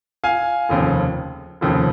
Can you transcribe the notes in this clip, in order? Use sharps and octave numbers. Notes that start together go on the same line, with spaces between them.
F5 G#5
F1 D#2 C#3 F3
F1 D#2 C#3 F3